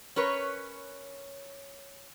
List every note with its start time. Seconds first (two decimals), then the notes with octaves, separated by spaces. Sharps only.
0.16 C#4 A#4 B4 C#5